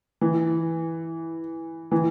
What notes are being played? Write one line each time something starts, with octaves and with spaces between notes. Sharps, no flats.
E3
E3